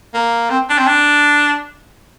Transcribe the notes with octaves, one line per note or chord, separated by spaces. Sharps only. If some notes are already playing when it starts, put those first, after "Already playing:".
A#3
C4
D4
C4
D4